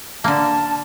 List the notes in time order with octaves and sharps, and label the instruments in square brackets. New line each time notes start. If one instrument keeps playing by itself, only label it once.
[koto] D3 A#3 [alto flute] A5